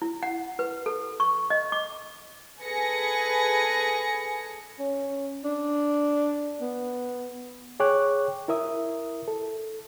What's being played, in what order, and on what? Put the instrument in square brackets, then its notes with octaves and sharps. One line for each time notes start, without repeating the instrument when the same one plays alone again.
[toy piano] E4
F#5
B4
A4
C#6
D#5
D6
[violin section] G#4 A4 B4 G#5 A#6 C#7
[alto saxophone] C#4
D4
B3
[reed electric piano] G#4 C#5 G5 C#6 D6 F#6
E4 A#4 E5 D#6
A4